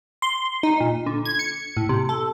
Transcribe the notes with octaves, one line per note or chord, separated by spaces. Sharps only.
C6
D#4
A#2
D3
G#6
C#7
A2
C3
A4